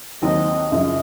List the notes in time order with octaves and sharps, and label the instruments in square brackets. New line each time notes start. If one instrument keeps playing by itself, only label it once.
[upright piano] D#2 D#3 F#3 C4 [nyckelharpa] D#5
[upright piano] F#2 C#3 F3 [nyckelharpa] D#5